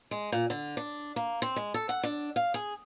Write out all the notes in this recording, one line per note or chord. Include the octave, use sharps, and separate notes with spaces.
G#3
A#2
D3
D4
A#3
C4
G#3
A4
F#5
D4
F5
G#4